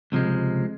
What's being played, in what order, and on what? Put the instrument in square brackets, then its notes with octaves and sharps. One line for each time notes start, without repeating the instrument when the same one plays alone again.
[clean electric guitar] C#2 C3 F3 G#3